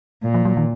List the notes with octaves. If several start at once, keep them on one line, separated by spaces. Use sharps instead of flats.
A#2
F3
F#3
D#3